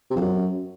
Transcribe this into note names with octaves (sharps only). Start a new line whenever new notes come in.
C3
F2
F#2